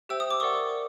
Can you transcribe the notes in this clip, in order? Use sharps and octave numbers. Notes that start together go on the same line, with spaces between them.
G4 C5 E5 G5 E6
D#6
D6
A#4 D5 F#5 C#6 D#6